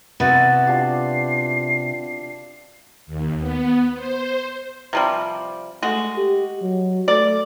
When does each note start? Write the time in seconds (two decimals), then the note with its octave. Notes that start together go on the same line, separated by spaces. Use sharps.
0.20 C3 B3 E4 F#4 A6
0.67 D4 F4 G4 C7
3.07 D#2
3.39 B3
3.95 C5
4.93 C3 F3 G3
5.83 G#3 A3 F#4
6.17 G4
6.61 F#3
7.08 A3 D5